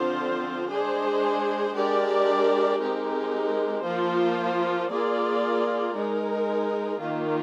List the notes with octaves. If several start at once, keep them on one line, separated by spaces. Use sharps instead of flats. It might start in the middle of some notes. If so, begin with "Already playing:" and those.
Already playing: D3 F3 C4 F4 C5
G#3 D4 G#4 C5
G#3 D4 G4 A#4 D5
G#3 C4 D#4 G4 A#4
F3 A#3 F4 C5
A#3 F4 G#4 D5
G#3 D#4 A#4
D#3 A#3 F4